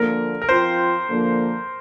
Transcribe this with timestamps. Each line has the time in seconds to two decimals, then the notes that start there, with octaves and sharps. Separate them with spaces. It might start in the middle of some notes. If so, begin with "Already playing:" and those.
Already playing: D3 F3 A#3 A#4
0.42 A#4
0.49 F3 C4 F4 C5
1.08 D3 F3 A#3